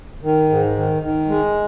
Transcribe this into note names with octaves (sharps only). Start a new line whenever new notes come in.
D#3
G#2
D#3
D#3
G#3